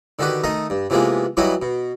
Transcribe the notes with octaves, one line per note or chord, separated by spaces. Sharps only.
D3 D#3 F#4 G4 B4
D#3 A3 D#5 A#5
G2
C3 E3 F3 G#3 A#3 B3
E3 F#3 G3 E4 F#4 D#5
B2